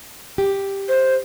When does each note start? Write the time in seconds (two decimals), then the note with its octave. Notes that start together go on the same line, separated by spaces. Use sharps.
0.38 G4
0.89 C5